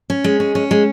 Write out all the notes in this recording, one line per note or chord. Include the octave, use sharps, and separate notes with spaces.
C#4
G#3
C#4
C#4
G#3